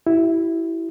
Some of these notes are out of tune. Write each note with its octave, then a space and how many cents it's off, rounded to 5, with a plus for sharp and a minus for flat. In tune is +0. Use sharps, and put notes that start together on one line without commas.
E4 +0 G4 -45